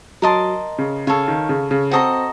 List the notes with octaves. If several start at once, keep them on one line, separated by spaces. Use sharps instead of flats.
F#3 A#4 D#5 A5 C6
C#3
C#3 A4 C#5 F5
D#3
C#3
C#3
C4 F#4 A4 D#5 A#5